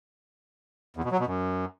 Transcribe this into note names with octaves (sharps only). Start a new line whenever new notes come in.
E2
B2
F#3
B2
F#2